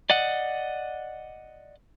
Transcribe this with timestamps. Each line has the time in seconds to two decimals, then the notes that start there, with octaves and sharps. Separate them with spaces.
0.10 D5 D#5 F#5